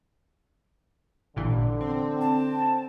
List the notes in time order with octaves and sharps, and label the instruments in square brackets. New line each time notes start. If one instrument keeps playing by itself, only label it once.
[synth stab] A1 A#2 E3 [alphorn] D3
[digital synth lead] C4
[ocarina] A5